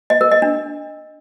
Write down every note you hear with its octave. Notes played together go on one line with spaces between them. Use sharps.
D#5
A#4
D#5
D4